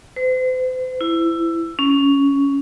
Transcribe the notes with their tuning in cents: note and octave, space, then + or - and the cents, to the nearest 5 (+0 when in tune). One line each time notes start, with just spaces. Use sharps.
C5 -40
E4 +15
C#4 +10